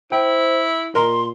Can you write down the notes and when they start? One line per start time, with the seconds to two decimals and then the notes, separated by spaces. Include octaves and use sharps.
0.12 E4 C5 G5
0.95 A#2 A#4 D#5 A#5 C6